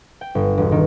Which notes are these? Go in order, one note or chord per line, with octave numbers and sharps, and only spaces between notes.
G5
G1
E1
D#3